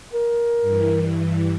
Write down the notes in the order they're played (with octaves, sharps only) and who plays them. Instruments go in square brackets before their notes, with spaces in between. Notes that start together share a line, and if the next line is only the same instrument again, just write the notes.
[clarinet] A#4
[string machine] G2 E3